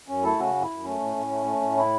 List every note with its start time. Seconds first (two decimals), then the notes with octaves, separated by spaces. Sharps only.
0.08 F#2 C#4
0.24 A3 E4 A4
0.39 C#3 C#4 F#4
0.54 F#2
0.62 E4
0.70 F#2
0.85 A3 C#4
1.00 A2
1.16 A2
1.31 A3
1.46 A3
1.61 A2
1.76 E4